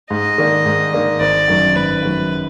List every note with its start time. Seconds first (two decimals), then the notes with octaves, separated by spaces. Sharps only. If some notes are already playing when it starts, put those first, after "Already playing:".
0.10 G#2 D#5
0.38 D#3 A#3 D4
0.66 G#2
0.93 D#3 A#3 D4
1.20 G#1 D5
1.48 F#2 D#3 F#3
1.76 G#1 B4
2.03 F#2 D#3 F#3